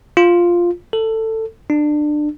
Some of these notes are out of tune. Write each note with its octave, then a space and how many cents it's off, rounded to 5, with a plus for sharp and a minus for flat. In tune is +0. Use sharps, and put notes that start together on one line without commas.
F4 +0
A4 +15
D4 +25